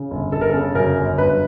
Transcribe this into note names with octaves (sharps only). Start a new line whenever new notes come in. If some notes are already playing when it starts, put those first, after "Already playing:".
Already playing: C#3
G1
G1 A4
A#4
C#3 A4
F#2 A#4
G1
G1 B4